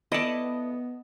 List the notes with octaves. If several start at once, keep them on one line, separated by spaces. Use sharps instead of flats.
B3 E4 A4 D5 D#5 A5